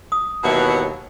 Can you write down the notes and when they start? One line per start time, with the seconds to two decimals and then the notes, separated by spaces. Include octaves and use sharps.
0.12 D#6
0.44 D#2 B2 E3 F#3